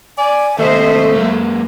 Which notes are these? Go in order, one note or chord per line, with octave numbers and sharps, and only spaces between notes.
D5 G#5
D#2 C3 A3 A4 C5 D#5 E5
F#2 G#3 A#3